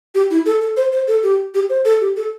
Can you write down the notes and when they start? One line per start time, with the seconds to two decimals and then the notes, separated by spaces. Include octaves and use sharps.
0.15 G4
0.31 E4
0.46 A4
0.61 A4
0.77 C5
0.92 C5
1.08 A4
1.23 G4
1.55 G4
1.70 C5
1.85 A4
2.01 G4
2.16 A4